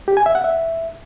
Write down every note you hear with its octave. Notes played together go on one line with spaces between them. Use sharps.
G4
G#5
E5
F#5
E5